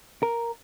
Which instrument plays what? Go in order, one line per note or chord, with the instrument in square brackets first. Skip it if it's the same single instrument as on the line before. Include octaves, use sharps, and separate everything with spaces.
[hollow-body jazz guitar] A#4